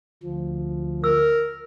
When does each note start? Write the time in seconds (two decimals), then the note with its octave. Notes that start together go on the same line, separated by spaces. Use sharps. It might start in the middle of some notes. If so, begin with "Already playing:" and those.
0.23 D2 F3
1.04 A#4 E6